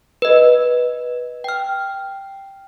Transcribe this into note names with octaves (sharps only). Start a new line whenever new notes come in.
B4 D#5
G5 F6